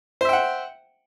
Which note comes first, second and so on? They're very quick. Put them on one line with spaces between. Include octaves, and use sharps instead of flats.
C5 E5 G5 F#5